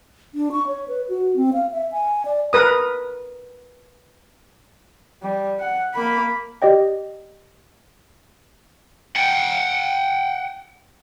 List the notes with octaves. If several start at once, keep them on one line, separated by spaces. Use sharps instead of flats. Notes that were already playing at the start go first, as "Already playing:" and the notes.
D4
C#6
C#5
B4
F#4
C4
F5
E5
G#5
D5
A#4 B4 D#6
G3
F#5
A#3 B5
G4 D5 D#5 G5
F#5 G5